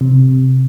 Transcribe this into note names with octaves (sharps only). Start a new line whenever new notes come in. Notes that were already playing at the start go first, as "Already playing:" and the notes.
C3